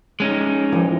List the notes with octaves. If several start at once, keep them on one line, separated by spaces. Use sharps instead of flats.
G#3 C#4 D#4
E3 F3